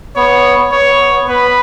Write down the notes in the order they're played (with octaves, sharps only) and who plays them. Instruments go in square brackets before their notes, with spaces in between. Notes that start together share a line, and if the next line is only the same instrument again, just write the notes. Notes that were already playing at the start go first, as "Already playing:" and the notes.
[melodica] B3 [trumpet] C#5
[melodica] B3 [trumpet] C#5
[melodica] B3
[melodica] B3 [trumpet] B4